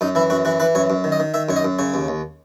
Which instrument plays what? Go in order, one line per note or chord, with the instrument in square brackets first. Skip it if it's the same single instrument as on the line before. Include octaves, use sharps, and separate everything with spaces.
[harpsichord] F#2 D#4
E3 E4
F#2 F#4
E3 F#4
E3 B4
F#2 C#5
F#2
D#3
D#5
D#3
D#3 E5
F#2 C#5
D#5
F#2
C#3 C#5
D#2
D#2